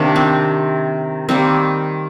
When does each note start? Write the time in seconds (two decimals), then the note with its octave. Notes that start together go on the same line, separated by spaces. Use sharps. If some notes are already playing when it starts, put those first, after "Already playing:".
Already playing: C3 D#3 A#3 D4
0.16 C4
1.29 D#3 G3 A#3 C4